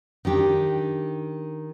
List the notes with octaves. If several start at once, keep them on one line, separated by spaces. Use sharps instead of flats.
D#3 D4 G4